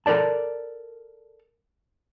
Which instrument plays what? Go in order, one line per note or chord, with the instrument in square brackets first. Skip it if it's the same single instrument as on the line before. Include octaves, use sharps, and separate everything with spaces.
[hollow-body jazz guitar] A4 A#4 C5 D5 A5